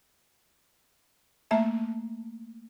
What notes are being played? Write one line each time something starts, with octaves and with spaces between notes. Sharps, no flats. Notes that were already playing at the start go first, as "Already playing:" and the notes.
A3 A#3 E5 A5